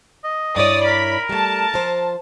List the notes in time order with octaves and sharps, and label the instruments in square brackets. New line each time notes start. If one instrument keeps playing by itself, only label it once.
[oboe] D#5
[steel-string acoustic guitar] G2 E4 C#5 [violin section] D5 D#6
[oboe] A#4 [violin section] B5
[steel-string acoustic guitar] G3 A3 [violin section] A5
[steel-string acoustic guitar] F3 C5